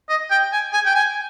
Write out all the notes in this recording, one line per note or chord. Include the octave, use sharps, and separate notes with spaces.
D#5
G5
G#5
G#5
G5
G#5